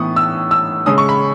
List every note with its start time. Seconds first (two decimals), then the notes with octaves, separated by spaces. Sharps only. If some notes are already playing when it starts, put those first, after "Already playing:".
Already playing: A2 E3 B3 C#6 D#6
0.16 E6
0.51 E6
0.86 C#3 G#3 C#4 D#6
0.98 C#6
1.09 B5